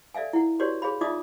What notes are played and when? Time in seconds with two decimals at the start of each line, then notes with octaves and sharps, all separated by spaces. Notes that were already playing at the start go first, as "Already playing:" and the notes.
0.14 A4 D5 E5 F5 G#5
0.33 E4 F#5
0.60 F#4 G4 B4 C#5 D5 C6
0.82 G#4 C#5 F5 B5
1.01 D#4 F4 D5 E5 D6 D#6